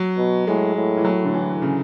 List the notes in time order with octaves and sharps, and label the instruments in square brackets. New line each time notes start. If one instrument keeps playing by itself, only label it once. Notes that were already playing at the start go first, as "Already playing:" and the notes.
Already playing: [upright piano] F#3
[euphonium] B2
[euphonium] A2 [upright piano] G#3
[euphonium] A2
[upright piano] E3
F#3
D3
E3
C#3